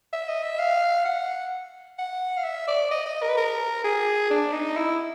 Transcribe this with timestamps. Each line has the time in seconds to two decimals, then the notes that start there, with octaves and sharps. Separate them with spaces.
0.13 E5
0.28 D#5
0.42 E5
0.59 F5
1.05 F#5
1.98 F#5
2.37 F5
2.44 E5
2.67 D5
2.91 D#5
3.06 D#5
3.22 A#4
3.29 B4
3.37 A#4
3.84 G#4
4.30 D4
4.52 D#4
4.77 E4